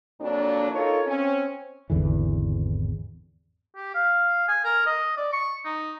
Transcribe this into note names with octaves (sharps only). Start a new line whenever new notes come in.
F2 F#3 A#3 D4
D#4 F4 A4 A#4 C#5
C4 C#4
G#1 E2 D3 E3
G4
F5
G#5
A#4
D#5
D5
C#6
D#4